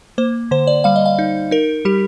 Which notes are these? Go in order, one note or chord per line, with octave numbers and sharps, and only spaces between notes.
A#3 C5
D3 C5
D5
G3 F5
D#5
F5
D#4
D#4 A#4
G3 G4